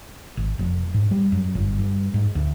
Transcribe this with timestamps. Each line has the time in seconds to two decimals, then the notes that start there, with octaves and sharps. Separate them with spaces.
0.37 G#1
0.59 F1
0.94 G#2
1.11 G3
1.32 F#2
1.55 G1
1.79 G2
2.14 G#2
2.35 D2